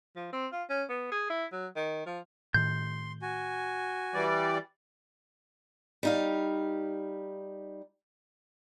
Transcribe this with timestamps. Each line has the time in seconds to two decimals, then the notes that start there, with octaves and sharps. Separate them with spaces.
0.16 F3
0.33 C4
0.52 F4
0.70 C#4
0.89 B3
1.12 G#4
1.30 E4
1.52 F#3
1.76 D#3
2.06 F3
2.54 A2 D#3 C6 G6
3.22 F#4 G#5
4.14 E3 G3 D5
6.03 G3 D#4 F5